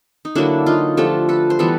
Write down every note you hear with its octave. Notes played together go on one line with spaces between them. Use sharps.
D#4
D3 F#3 A#3 D4 E4
D#4 F4
D3 F3 A3 G4 A4
A4 B4
C5
E3 G3 B3 A4 B4